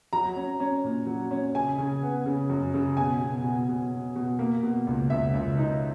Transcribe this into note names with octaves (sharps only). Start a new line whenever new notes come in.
F#3 A#5
C#4
C#4
A#2
F#3
C#4
C#3 G#5
C#3
B3
C#3
F#2
C#3
B2 G#5
B2
B2
B2
B2
B2
A#3
B2
C#2
C#2 E5
C#2
D#4